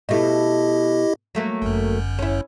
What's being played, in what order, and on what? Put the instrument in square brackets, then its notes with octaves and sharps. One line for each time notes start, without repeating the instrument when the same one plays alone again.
[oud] B2 A3 [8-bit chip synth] E4 G4 D#5
[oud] F#3 A3 A#3
[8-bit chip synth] G1 F#2
[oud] C#4 E4